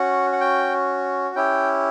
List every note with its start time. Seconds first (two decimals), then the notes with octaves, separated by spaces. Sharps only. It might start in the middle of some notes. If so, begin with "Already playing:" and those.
Already playing: C#4 F#4 F#5
0.33 F#5
0.41 G5
1.35 C#4 E4 G4 G5